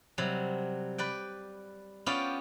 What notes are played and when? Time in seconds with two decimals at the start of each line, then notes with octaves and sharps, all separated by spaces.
0.18 C3 F#3 G3
0.98 B4 D5 G5
2.06 B3 C#4 F4 G4 D5 G5